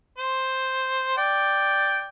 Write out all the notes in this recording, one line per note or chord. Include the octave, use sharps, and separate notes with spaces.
C5
D5 G5